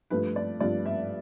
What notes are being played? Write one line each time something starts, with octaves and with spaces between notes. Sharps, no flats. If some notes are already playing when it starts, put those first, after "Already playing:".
G2 F3 A3 B4
D5
G2 F3 A3 D5
E5